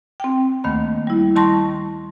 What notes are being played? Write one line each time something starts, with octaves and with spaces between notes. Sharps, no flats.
C4 G5
D2 D#3 A3 A#3 B5
G3 E4
D#3 G3 A5 C6 C#6 A#6